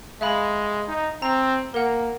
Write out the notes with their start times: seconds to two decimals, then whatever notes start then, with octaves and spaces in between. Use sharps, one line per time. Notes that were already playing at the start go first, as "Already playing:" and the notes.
0.21 G#3 E5 F5 B5
0.88 D#4
1.22 C4 A#5
1.74 A#3 A#4 F#5